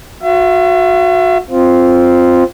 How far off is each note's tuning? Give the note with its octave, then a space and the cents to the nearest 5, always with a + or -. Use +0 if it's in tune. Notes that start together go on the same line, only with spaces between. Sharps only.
F#4 -20 E5 +40
C4 +0 F4 +0